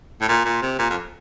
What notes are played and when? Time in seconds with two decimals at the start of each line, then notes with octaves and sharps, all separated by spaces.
0.21 A2
0.29 A#2
0.45 A#2
0.62 C3
0.79 A#2
0.90 F2